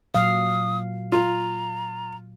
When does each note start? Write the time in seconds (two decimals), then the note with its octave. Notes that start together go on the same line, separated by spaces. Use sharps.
0.14 A#2 F#3 F5 D#6
1.12 F4 A#5